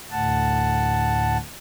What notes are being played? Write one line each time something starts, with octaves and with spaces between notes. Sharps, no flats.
D2 A2 F#5 A5